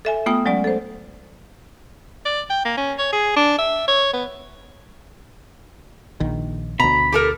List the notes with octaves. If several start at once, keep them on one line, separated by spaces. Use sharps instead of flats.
A4 E5 G#5
A3 B3 F4 G5 D#6
F#3 G#3 C#4 D5
A4 C5
D5
G5
A#3
C#4
C#5
G#4
D4
E5
C#5
B3
A#1 D#3
D2 B2 A#5 B5
G4 A4 A#4